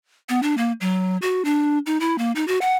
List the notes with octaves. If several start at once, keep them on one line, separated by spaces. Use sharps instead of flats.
B3
D4
A#3
F#3
F#4
D4
D#4
E4
A#3
D#4
F#4
F#5